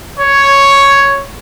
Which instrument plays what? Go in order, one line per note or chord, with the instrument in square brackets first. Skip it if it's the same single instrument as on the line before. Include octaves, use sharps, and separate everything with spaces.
[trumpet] C#5